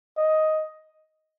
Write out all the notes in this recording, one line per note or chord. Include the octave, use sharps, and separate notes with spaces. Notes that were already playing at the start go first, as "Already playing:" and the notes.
D#5